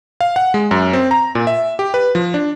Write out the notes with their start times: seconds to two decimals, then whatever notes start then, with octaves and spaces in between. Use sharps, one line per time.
0.21 F5
0.36 F#5
0.54 G#3
0.71 F#2
0.93 C4
1.11 A#5
1.35 A#2
1.47 E5
1.79 G4
1.94 B4
2.15 F3
2.34 D4